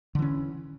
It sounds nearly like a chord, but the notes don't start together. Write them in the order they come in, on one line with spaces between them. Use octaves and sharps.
D3 E3 C#4